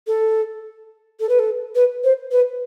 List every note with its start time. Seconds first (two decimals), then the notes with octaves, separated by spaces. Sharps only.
0.07 A4
1.20 A4
1.29 B4
1.39 A4
1.75 B4
2.04 C5
2.31 B4